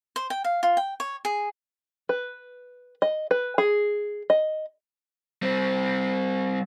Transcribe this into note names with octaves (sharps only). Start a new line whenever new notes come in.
C5
G5
F5
F4
G5
C#5
G#4
B4
D#5
B4
G#4
D#5
G3 C4